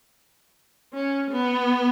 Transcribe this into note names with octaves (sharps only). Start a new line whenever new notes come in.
C#4
B3